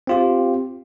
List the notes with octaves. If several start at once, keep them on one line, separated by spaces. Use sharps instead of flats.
C4 F4 G4